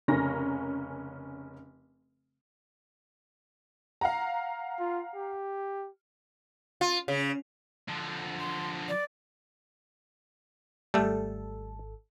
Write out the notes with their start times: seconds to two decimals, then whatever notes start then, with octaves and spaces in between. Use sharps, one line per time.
0.08 F1 C#3 C#4 A#4 A#6
4.01 F5 F#5 A#5
4.80 F4
5.15 G4
6.81 F4
7.08 C#3
7.89 D3 F3
8.40 C6
8.88 D5
10.94 G#1 G3 A3 A4